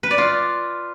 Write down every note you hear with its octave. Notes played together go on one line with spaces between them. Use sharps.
B4
D5
F4